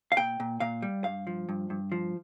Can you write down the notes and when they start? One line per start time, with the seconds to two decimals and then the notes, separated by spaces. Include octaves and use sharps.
0.12 F5
0.17 A#2 G5
0.40 A#2
0.60 A#2 F5
0.82 G3
1.04 G2 F5
1.27 F3
1.49 G2
1.70 G2
1.92 F3